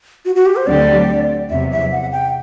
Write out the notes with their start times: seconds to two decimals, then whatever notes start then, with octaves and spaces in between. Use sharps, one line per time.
0.25 F#4
0.35 F#4
0.46 G4
0.56 C5
0.67 D2 D3 F#3 C4 G4 D5
1.49 E2 C3 F#3 E5
1.71 E5
1.92 F#5
2.12 G5